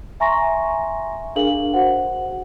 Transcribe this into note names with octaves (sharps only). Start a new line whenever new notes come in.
E5 G#5 A#5 C6 C#6 A#6
D4 G#4 A#4 F5 F#7
F#4 C5 F#5